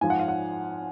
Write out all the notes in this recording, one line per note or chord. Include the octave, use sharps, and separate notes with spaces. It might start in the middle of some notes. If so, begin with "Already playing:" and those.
G#2 F3 G#5
F#5
F5
F#5